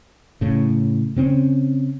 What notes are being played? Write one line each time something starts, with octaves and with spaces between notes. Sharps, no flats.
A2 C#3
C#3 C4 C#4